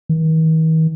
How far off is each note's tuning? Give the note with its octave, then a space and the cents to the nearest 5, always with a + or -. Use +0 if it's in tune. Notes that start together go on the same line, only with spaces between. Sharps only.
D#3 +45